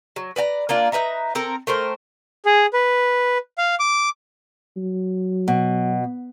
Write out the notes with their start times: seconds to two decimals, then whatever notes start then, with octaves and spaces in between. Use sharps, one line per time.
0.16 F#3
0.36 B4 D5 F#5 A#5
0.69 A#3 D4 F4
0.92 D#4 B4 E5 A#5
1.35 C4 A4 A#4
1.67 A3 A#4 C5 G5
2.45 G#4
2.73 B4
3.58 F5
3.79 D6
4.77 F#3
5.48 B2